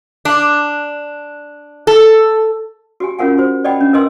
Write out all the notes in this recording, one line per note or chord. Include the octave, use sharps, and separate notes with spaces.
D4
A4
F#4 G4 G#5
C#4 F4 A#4 F#5 G#5
F#4 C5
D5 D#5 F#5 G5 B5
C#4 D4
A#4 B4 D#5 G#5 C6 E6